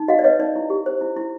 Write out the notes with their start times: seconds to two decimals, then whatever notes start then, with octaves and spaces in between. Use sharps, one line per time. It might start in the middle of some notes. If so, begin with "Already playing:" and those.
Already playing: D#4
0.08 F#4 D#5 F5
0.19 D5
0.24 B4 C#5 D#5
0.39 D#4 D5
0.56 E4
0.70 G4
0.86 C5
1.01 E4
1.17 E4